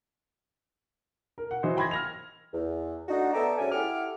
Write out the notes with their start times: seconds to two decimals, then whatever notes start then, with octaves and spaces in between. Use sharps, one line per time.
1.38 A#4
1.51 F#5
1.63 E3 F#3 D#4 C5
1.77 G5 B5 C6 G#6 A#6
1.91 F6 A#6 F7
2.54 E2
3.09 A3 D4 D#4 F#4
3.34 B3 A4 D5 E5 G5 A#5
3.58 G#2 F#3 C#4 D5 E5 G#5
3.72 E4 G4 A4 F#5 D6 F6